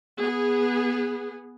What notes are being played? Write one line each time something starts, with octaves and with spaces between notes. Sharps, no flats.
B3 G#4